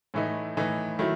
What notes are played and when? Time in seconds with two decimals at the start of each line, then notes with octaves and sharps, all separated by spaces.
0.14 A2 E3 A3 D#4
0.57 A2 E3 A3 D#4
0.99 D#3 F#3 A3 E4